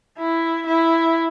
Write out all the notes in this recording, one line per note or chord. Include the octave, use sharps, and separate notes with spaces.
E4
E4